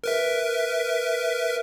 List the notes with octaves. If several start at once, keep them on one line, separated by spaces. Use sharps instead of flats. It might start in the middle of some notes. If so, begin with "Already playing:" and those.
A#4 B4 E5